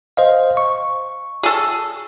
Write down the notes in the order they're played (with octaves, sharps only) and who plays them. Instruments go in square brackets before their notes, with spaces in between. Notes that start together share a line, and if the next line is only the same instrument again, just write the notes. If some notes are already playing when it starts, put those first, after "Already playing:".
[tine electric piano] C5 D#5 F5
C#6
[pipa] G#4 A4